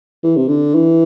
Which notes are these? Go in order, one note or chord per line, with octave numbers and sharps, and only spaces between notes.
E3
C3
D3
E3